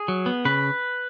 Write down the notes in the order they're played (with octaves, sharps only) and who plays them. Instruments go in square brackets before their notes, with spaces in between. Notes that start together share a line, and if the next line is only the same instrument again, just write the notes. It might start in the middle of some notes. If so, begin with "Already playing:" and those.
Already playing: [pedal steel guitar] G#4
F#3
B3
C#3 B4